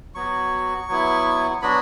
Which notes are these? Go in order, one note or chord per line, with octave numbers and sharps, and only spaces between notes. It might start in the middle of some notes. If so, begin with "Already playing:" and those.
F#3 B3 F#4 C#6
F#3 B3 E4
F#3 B3 D4 F#4 B5